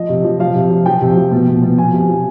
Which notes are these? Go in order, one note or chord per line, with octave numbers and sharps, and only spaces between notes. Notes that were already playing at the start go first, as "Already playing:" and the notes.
Already playing: F3 D#5
C3
F3
F3 F5
C3
F3
F3 G5
C3
F3
B2
B2
B2
F3 G#5
C3
F3